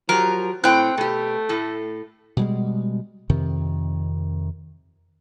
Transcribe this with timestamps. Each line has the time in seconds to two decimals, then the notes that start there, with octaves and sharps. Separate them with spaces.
0.09 F3 F#3 G4 A#4
0.64 A2 C4 G5 F#6
0.97 B2 A3 G4
1.49 A2 A4
2.37 B2 G3 G#3
3.30 F2 C3 D#3